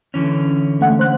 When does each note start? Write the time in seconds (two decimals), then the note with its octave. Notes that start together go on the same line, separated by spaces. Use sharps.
0.14 D3 E3 C#4
0.81 A3 F#5
0.99 C5 F#6